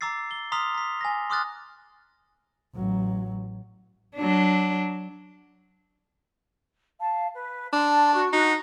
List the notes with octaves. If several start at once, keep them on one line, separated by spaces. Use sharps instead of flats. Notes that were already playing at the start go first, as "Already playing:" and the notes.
A#5 D6 E6 A6 C7
G7
A#5 C6 D#6 F6 B6 F7
A#5 B6
G#5 A#6
C6 D6 D#6 F6 F#6 A6
A1 F#3
F#3 D4
F5 A5
B4
D4 A5 C6
F#4 C#6
D#4 F#4